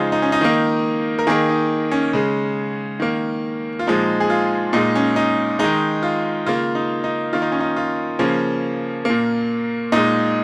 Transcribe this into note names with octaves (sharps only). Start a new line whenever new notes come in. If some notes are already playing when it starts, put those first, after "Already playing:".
Already playing: C#3 F3 G#3 C#4 D#4 F4 G#4
D#4
C#4
D#4
D#3 A#3
A#4
D#3 A#3 G#4
D#4
C#4
C#3 G#3
D#3 A#3
F4
A#2 F3 G#3 D#4
G#4
F4
A#2 G#3 D#4
C#4
D#4
D#3 G#3 D#4
F4
C#3 A#3 F4
D#4
D#4
D#3 A#3 F4
D#4
C#4
D#4
F4
C#3 F3 A#3 C#4
A#2 A#3
A#2 G#3 D#4